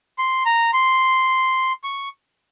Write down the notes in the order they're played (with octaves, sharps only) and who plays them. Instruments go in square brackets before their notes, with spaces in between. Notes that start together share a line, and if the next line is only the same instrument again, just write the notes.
[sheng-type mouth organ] C6
A#5
C6
C#6